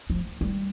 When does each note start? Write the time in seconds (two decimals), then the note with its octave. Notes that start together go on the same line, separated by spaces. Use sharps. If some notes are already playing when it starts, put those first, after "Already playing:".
0.10 F3
0.41 G3